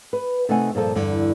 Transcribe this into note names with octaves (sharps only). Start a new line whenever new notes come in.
B4
C3 A3 D#4 F#5 G#5
G2 A#2 F3 A4
E2 G2 D3